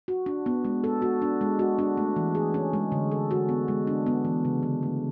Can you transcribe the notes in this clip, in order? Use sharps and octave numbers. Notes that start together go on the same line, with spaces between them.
F#4
D4
B3
G#3
A4
F#4
D4
G#3
F#4
D4
A3
E3
G#4
C#4
G#3
D3
A4
F#4
B3
G#3
D4
B3
E3
C#3
D3
A3